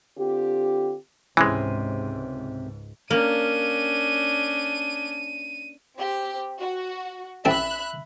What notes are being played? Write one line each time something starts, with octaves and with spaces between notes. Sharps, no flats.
D3 C4 F4 G4
C#2 G#2 C3 E3 G#3 C#4
A#3 C#4 D4 D#7
C4 G4
F#4
A1 C4 E5 A5 B5 F#6